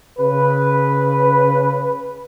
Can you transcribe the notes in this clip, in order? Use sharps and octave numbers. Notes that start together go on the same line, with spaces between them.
C#3 B4